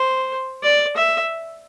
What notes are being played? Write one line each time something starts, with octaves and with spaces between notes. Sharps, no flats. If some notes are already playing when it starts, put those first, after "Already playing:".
Already playing: C5
D5
E5